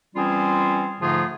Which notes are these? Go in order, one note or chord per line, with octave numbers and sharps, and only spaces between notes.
E3 G3 C4 C#4 F4 G#4
G#2 D3 F3 A3 F4 G#4